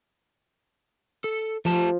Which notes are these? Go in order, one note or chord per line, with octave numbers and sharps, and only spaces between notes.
A4
F3 A3 G4 A5